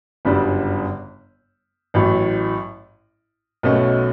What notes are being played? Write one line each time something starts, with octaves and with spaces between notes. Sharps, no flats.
G1 F#2 C#3 G3 D4
A1 A2 F#3
B1 B2 A3 C#4